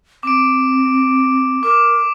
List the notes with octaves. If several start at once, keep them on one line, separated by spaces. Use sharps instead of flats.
C4 D6 D7
A#4 D6